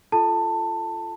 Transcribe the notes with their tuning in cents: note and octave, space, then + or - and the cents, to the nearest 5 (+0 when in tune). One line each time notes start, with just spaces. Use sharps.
F4 -25 A4 -15 A5 +15